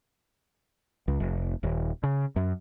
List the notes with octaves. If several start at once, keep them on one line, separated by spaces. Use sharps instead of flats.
C#2
F1
D#1
C#3
F#2